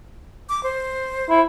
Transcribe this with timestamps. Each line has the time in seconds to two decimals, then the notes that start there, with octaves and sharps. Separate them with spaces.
0.49 D6
0.63 C5
1.30 E4